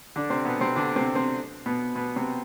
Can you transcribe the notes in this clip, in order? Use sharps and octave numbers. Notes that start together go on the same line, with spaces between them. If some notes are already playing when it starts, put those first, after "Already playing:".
D3 D4
C3 C4
B2 B3
C3 C4
D3 D4
C3 C4
C3 C4
B2 B3
B2 B3
C3 C4